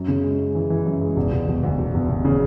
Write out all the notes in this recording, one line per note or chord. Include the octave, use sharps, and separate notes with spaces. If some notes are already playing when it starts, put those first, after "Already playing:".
Already playing: F#2
C#3
G#3
G#3
E3
E3
F#2
G#3
E1
E1
E1
D2
E1
E1
E1
C#3